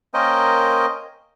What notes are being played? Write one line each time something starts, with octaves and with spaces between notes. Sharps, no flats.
A#3 C#4 A#4 C5 D#5 G5